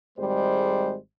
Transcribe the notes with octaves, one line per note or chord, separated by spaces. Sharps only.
G#1 G3 G#3 C5